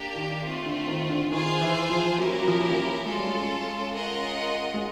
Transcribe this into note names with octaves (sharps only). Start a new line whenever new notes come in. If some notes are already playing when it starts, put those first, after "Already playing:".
Already playing: A#3 D4 G4
D#3
A3 C4 F4
D3
D#3
D3
D#3 F4 G#4 C5 F5 G#5
E3
F3
F#3 A#3 C#4 E4 G4 A#4
F#3
F3
F3
F#3
G#3 C#4 F4 A4
G3
G#3
C#4 F4 A#4 D#5 F#5
G#3